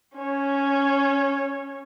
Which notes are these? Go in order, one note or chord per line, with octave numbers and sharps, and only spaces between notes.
C#4 C#5